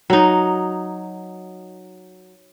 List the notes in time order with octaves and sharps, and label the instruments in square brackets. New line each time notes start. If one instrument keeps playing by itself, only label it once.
[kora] F#3 D#4